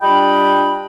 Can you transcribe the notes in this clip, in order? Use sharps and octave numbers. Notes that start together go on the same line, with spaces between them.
G3 D4 F4 D#5 G5 B5